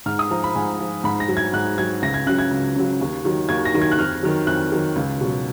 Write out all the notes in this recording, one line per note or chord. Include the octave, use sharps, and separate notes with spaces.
G#2 F6
D#6
F3 A#5
B5
G#2 G#5
F3
G#2 B5
A#6
F#3
G#6
G#2 F#6
F#3 G#6
C#2 A#6
G#6
C#3 F#3 F#6
G#6
C#2
C#3 F#3
D#2
D#3 F#3
D#2 G#6
A#6
D#3 F#3
G#6
F#6
F2 F6
D#3 F#3
F2 F#6
D#3 F#3
C#2
B2 F#3